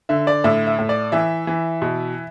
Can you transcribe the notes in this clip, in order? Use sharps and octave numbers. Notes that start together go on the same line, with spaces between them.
D3 E5
D5
A2 E5
E5
A2
D5
E3 E5
E3
B2